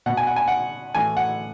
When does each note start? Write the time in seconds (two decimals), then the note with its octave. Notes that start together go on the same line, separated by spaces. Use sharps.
0.06 B2 F#5
0.17 G#5
0.27 F#5
0.36 G#5
0.48 F#5
0.95 A2 E3 G#5
1.17 F#5